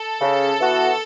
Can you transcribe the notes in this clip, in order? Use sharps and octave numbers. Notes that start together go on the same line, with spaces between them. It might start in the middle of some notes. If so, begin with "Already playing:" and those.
Already playing: A4
C#3
E3 B3 F#4